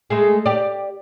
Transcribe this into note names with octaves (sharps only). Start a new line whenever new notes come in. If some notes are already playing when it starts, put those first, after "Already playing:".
G#3 A3 G#4
G4 D5